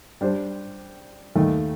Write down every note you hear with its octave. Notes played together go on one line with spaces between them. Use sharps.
G3 D4 G4 C5
D#2 D#3 A3